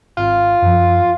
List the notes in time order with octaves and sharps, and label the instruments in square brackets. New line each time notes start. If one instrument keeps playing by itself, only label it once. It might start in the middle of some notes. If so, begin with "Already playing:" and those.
[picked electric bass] G#1 [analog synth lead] F4
[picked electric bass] F#2 F3